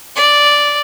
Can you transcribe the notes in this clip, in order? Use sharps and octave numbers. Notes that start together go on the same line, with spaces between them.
D5